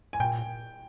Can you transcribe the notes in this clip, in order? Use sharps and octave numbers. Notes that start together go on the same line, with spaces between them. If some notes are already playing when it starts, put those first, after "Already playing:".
G#5
A#2 G5